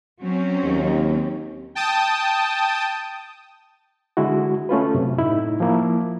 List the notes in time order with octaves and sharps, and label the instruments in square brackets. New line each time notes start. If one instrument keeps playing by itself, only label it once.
[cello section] F#3 C4 C#4
[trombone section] D#2
[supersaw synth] G5 A5 D#6
[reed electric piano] D3 G#3 E4 F#4
A3 C#4 F4 B4
F#2 C3
A2 D#4 E4
F3 A#3 E4